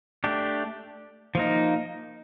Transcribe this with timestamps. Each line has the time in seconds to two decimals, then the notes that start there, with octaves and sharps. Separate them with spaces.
0.24 A3 D4 G4
1.35 F3 A#3 D#4